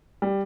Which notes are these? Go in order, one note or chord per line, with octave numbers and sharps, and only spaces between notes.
G3